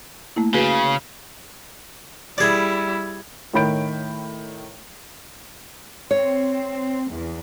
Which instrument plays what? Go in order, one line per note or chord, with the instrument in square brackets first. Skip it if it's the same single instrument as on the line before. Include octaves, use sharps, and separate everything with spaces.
[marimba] A3 A#3 E4
[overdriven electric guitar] C#3 [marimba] F#4 G#4 B4
[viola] G3 E4 [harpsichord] G#4 D5
[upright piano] A2 D#3 C#5 B5 G6 D7
[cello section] C4 [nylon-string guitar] C#5
[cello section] E2